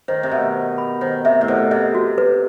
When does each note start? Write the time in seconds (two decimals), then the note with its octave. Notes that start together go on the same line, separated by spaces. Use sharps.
0.08 D#3 C5
0.23 C3
0.31 B2 E5
0.55 C5
0.78 B5
1.01 D#3 C5
1.25 C3 E5
1.41 A2
1.48 B2 C5
1.71 C3 D#5
1.95 F#4
2.18 B4